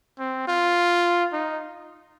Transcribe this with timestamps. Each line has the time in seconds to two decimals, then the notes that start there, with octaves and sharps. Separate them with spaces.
0.19 C4
0.47 F4
1.32 D#4